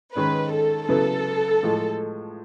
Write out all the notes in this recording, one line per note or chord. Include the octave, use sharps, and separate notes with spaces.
D#3 G#3 C#4 B4
A4
C#3 F#3 B3 E4 A4
A2 F3 G#3